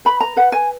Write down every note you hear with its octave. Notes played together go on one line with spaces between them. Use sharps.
B4 B5
A#5
B4 F#5
G#5